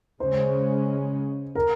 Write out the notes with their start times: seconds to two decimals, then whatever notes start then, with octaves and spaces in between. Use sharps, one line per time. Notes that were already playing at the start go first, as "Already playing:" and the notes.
0.20 C#3 G#3 C#4 C5
1.55 A#4